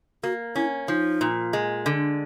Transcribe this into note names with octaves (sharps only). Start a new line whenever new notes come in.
A#3 F#4
C#4 E4
F3 D#4
A#2
G#3
D3